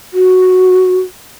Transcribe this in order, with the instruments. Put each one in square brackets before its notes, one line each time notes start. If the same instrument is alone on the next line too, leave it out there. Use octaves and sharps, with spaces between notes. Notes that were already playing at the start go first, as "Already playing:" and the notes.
[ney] F#4